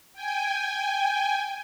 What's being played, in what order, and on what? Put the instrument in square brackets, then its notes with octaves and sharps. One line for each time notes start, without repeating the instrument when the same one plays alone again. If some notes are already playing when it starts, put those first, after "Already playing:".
[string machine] G5 G#5